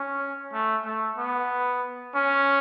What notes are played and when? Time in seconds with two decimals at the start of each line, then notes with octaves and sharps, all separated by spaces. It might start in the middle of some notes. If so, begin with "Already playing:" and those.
Already playing: C#4
0.53 A3
0.85 A3
1.18 B3
2.15 C#4